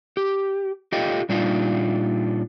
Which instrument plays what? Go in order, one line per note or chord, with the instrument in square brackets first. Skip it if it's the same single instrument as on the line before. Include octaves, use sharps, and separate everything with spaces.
[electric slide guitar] G4
F4 G4 A4 D#5 F5 G5
A#2 G3 D4 D#4 F4